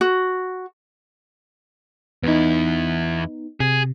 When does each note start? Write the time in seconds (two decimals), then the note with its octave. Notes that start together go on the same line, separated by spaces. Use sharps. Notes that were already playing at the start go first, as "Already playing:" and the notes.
0.01 F#4
2.23 E2 B3 D#4 E4
3.60 C3 G#4